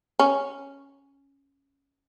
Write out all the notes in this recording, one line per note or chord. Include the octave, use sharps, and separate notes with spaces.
C#4